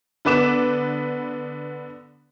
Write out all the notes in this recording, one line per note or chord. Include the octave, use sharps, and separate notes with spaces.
D3 B3 B4 D6 E7